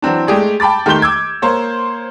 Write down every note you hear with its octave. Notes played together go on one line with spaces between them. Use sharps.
E3 F#3 C4 D4
G#3 A3 G4 G#4 D5
G5 A5 B5 D6 A6
D#3 A3 G4 C6 G6 G7
D6 E6 G#6
A#3 C5 C#5